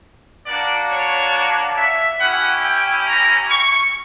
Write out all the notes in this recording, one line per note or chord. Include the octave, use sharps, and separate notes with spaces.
A#3 D4 F#4 D5
C#5
E5
C#4 E4 G4 F#5
G5
A#5
C#6